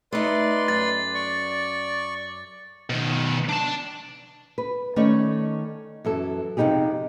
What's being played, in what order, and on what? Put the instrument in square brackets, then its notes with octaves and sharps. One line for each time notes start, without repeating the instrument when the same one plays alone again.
[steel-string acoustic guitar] A3 D#4 [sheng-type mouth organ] B4 D5 C6
[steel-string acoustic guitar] F#2 [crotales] A6
[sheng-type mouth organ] D5 C#6
[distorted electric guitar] B2 D#3
D4 A5
[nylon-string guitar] B4
D#3 A3 C#4 C#5 D5
F#2 E3 A4
F2 C3 F3 D#4 G4 G#4